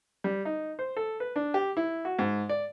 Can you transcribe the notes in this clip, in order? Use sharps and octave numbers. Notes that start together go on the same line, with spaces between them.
G3
D#4
C5
A4
B4
D4
G4
E4
F#4
G#2
D5